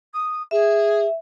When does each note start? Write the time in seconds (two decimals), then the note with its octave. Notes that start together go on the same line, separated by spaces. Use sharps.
0.13 D#6
0.51 G#4 E5